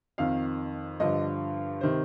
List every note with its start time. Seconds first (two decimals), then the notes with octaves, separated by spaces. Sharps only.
0.18 F2 D#3 F5
1.00 G2 D3 F3 D#5
1.81 C3 D#3 C5